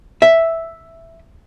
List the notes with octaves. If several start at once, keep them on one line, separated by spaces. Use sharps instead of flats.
E5